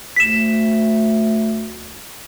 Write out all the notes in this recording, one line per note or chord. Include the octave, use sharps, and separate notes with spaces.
D2 B6 E7